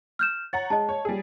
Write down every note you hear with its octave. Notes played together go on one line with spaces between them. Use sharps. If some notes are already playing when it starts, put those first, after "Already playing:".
F6 G6 E7
C#5 F#5 A#5 A6
G#3 D#5 A5
C#5
G3 G#4